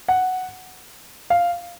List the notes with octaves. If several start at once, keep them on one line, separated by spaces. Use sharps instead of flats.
F#5
F5